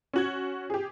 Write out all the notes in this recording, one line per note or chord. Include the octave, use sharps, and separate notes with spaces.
C#4 F#4 G#6
G4 G#4